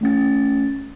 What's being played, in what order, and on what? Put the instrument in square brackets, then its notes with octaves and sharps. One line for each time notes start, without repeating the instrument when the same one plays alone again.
[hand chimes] A3 C#4 A6